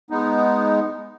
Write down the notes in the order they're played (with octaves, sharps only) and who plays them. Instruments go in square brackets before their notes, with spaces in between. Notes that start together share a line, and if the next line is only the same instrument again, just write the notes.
[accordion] G#3 B3 D#4